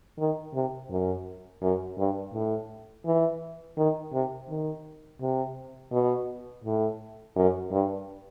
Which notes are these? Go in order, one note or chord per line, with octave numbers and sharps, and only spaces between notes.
D#3
C3
F#2
F#2
G2
A2
E3
D#3
C3
D#3
C3
B2
A2
F#2
G2